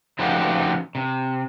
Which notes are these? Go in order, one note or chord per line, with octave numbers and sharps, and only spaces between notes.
C#3 F3 A3 D#4 F#4 G4
C3